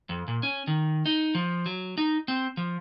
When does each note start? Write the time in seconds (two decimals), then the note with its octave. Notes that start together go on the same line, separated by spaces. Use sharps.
0.09 F2
0.28 A#2
0.43 C#4
0.67 D#3
1.06 D#4
1.35 F3
1.66 F#3
1.98 D#4
2.28 C4
2.57 F3